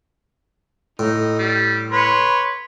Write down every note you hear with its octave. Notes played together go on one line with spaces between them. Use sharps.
A2 D#4
G3
B4 C#5 C6